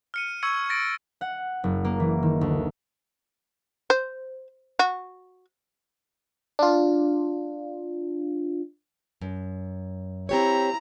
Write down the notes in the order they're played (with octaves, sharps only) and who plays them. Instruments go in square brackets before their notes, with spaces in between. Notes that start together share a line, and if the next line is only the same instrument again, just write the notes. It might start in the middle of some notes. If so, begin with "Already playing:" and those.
[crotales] F6 C#7 D#7
C#6 E6 G#6 C#7
A6 A#6 D7
[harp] F#5
F#1
A#3
E3
D#3
D2
[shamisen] C5
F#4
[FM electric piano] D4 F4
[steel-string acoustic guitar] F#2
[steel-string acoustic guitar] C4 G4 C#5 [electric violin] E4 A#5